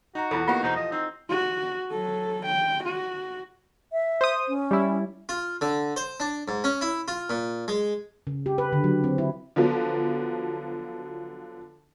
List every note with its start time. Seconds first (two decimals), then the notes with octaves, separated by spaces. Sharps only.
0.15 D#4 F#4 A#5
0.31 E2 B2 E4 F4 A4
0.48 A#3 B3 D#4 F4 G4 F#5
0.63 E2 B2 D#4 C5
0.76 F3 D#5
0.92 C4 D#4
1.29 F#4
1.91 F#3 A4
2.46 G5
2.84 F#4
3.93 E5
4.21 C5 D#6
4.48 C#4
4.71 G3 E4
5.29 F4
5.61 D3
5.96 C5
6.20 D4
6.48 G#2
6.64 C#4
6.81 E4
7.08 F4
7.30 A#2
7.68 G#3
8.27 C#3
8.46 G4
8.58 B4
8.73 D3
8.84 F#3
9.04 C4
9.18 E4
9.56 D3 F3 F#3 B3